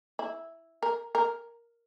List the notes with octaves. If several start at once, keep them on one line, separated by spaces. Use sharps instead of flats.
E4
A#4
A#4